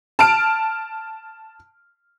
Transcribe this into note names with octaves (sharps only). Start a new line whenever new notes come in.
A5 F6 D7